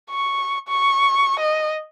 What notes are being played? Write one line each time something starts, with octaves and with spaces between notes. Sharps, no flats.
C#6
C#6
D#5